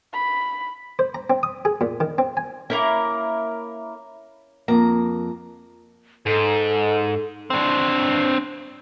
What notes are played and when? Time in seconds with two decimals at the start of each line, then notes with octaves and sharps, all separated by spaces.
0.13 B5
0.99 C5
1.15 A#5
1.30 C4
1.43 D#6
1.65 G#4
1.81 A#2
2.00 D#3
2.18 C4
2.37 G#5
2.70 A#3 C#4 E4 A#4
4.68 F2 A#3 A#5
6.26 G#2 A4
7.50 C4 D4